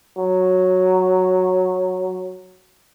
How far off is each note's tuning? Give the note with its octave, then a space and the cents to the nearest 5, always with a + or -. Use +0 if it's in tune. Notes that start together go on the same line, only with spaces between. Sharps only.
F#3 -5